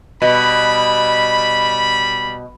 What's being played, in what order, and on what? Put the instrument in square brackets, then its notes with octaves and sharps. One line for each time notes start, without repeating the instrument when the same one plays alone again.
[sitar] B2 [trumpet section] G3 B5